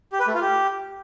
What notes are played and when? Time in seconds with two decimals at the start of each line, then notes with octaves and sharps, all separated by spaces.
0.12 G4
0.20 B4
0.27 A3
0.34 F4
0.42 G4